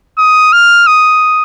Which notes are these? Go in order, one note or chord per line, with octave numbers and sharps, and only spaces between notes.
D#6
F6
D#6